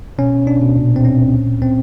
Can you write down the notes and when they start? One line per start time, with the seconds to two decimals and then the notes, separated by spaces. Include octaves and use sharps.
0.18 B2 C#4
0.34 B2
0.47 B2 D4
0.62 B2
0.76 A#2
0.91 A#2
0.96 C4
1.05 A#2 C#4
1.19 A#2
1.34 A#2
1.47 A#2
1.62 A#2 C4